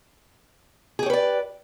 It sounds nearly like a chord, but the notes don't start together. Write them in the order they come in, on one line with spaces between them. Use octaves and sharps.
G#4 G4 C#5 B4 D5